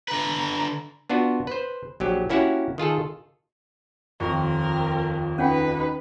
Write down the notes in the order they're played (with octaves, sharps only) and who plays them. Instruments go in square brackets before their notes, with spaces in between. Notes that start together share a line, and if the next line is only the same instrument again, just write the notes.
[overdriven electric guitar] D3 B4 [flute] A#5
[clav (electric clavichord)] B3 D4 F4 F#4
B4 C5
A#1 F#3 G4
A#3 C#4 E4 F#4 G4 F#5
D#3 F4 G#4 A4
[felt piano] D#1 F2 C#6 [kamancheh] C4 A#4
[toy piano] C#4 F#5 G5 [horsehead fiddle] D#4 B4